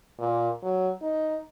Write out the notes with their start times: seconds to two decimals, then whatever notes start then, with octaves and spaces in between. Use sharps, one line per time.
0.19 A#2
0.63 F#3
1.02 D#4